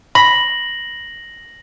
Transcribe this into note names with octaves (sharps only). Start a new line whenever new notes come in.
B5 A#6 F#7